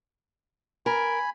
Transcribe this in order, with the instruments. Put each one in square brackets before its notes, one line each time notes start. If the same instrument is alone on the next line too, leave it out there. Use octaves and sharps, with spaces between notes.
[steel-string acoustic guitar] A#4 [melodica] G#5 B5